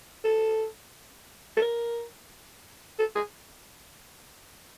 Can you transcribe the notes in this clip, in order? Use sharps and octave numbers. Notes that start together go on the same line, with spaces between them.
A4
A4
A#4
A4
G#4